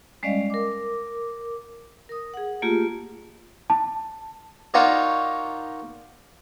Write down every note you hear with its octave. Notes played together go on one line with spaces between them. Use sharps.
G3 G#3 C#4 D5 D#5 F5
A#4 D6
A#4 D#6
G#4 F#5
A3 A#3 F4 G4 G#4
A5
D#4 F4 F#4 A#4 C#5 D5